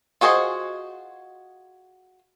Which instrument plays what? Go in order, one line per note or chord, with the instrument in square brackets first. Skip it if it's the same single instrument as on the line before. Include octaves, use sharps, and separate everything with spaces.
[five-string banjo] F4 F#4 G#4 C5 D#5